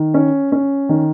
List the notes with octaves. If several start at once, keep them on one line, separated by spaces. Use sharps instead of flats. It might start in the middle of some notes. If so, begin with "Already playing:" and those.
Already playing: D#3
C#4
C#4
D#3